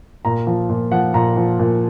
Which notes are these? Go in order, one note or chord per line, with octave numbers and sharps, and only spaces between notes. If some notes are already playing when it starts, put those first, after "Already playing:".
A#2 A#5
F3
A#2
F3 F#5
A#2 A#5
F3
A#2